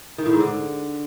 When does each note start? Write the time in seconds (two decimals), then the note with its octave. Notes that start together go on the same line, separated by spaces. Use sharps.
0.18 D#3
0.26 A2
0.33 G#2
0.40 D3